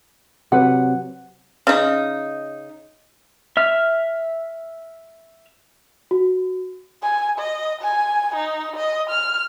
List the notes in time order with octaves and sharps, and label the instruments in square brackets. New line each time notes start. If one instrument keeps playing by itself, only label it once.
[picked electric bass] C3 F#3 [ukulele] B4 F#5
[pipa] C#3 D#4
[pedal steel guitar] E5 F6
[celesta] F#4
[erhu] G#5
D#5
G#5
D#4
D#5
F6